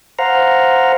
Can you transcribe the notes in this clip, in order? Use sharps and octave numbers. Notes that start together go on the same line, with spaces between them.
C5 F5 F#5 A#5